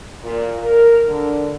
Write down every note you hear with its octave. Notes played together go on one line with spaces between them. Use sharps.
A#2
A#4
D3